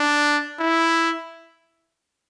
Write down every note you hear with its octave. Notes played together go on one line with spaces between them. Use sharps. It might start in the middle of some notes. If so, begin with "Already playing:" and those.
Already playing: D4
E4